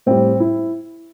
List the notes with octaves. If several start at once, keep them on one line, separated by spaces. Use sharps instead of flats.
A2 G3 C4
E4